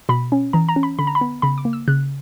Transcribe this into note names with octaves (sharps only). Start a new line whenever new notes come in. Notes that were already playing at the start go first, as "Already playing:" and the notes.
B2 B5
C#4
E3 A#5
A#5
C#4
B5
D3 B5
A#5
B5
B3
C#3 B5
D6
A#3
E6
C#3 F#6